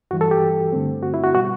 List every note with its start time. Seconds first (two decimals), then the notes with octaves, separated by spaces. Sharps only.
0.11 G2 E3 G3 F#4
0.21 A4
0.31 G4
0.72 G2 D3 A3 C4
1.03 F#4
1.14 E4
1.24 F#4
1.34 B2 G3 B3 F#4